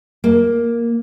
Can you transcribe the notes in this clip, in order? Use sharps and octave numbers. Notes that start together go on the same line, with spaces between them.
A#3